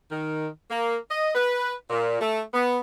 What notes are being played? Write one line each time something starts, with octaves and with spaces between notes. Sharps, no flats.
D#3
A#3
D#5
B4
A#2
A3
B3